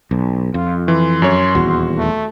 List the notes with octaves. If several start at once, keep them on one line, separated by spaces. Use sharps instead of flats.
B1
F2 F4
E3 C6
F#2 C#5
D#1 E2 F#4
A3